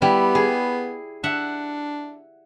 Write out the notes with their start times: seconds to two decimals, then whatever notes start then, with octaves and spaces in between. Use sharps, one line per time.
0.02 G3 B3 E4
0.35 G#4
1.24 D4 E5 F#5